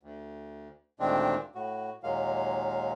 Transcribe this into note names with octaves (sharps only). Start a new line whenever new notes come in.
D2
D2 A#2 D#3 G#3 C4 D4
A2 F#4
D#2 A#2 F#3 G#3 A#3 F5